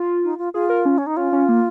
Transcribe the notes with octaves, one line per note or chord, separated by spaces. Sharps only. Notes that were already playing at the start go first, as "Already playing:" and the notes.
Already playing: F4
D#4
F4
F4 G#4
A#4
C#4
C#4
D#4
C#4 F4
C#4
A#3